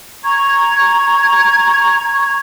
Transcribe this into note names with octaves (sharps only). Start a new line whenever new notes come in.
A#5 C#6 G#6